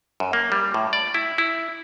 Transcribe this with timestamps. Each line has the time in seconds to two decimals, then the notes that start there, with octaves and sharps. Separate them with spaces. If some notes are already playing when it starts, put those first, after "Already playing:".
0.20 F#2
0.33 A#3
0.52 G3
0.74 A2
0.93 D5
1.14 E4
1.38 E4